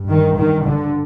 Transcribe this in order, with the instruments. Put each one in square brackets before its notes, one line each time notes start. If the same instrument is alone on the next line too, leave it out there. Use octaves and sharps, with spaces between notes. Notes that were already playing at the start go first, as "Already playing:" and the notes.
Already playing: [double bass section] G2
D#3
D#3
D3